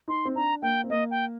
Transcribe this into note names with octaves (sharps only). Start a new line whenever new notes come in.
D#4 C6
C4
D4 A#5
A#3 G5
C4
A#3 D#5
G5